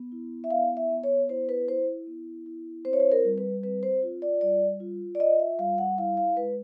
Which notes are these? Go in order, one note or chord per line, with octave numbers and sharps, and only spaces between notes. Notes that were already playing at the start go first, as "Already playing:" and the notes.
Already playing: B3
E4
E5
B3 F5
E5
B3
C#5
E4 C5
B4
E4 C5
B3
E4
C4 C5
C#5
C5
A#4
G3
B4
C4 B4
C5
F4
D5
G3 D5
F4
D5
F4 D#5
E5
G3 F5
F#5
E4 F5
F5
G#3 B4